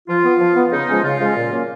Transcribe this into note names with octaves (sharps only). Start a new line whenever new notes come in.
F3 F4
B3
F3
B3
C#3 D#4
F3 G#3 C#4
C#3 F4
F3 G#3 C#4
A#2
F#3 A#3 C#4